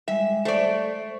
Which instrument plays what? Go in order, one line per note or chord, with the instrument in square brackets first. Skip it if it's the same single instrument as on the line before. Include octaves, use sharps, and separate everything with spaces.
[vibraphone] G3 G#3 [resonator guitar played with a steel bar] E5
[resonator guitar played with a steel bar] A3 D5 [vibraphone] C5 C#6